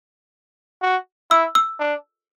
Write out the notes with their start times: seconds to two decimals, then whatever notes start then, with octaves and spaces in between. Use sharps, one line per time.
0.82 F#4
1.31 E4 E6
1.55 E6
1.80 D4